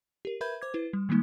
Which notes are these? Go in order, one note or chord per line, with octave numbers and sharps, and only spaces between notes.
G4 A#4
A#4 B4 E5 B5 G6 G#6
C5 D6 G#6
E4 B4
G3
D#3 G3 G#3 A#3 D#4